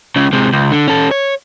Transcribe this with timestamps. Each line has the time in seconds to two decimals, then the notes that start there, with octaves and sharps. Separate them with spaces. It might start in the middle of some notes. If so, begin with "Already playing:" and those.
0.16 C#2 C#3
0.33 C3 G#3
0.53 C#2
0.72 D3
0.88 C#4 A4
1.11 C#5